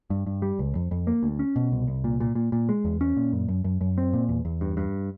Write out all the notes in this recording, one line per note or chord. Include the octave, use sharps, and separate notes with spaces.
G2
G2
G3
C#2
F2
F2
A#3
D2
C#4
B2
C2
C2
A#2
A#2
A#2
A#2
G#3
E2
C#4
A#2
F#2
F#2
F#2
F#2
C4
A#2
E2
E2
G2
G2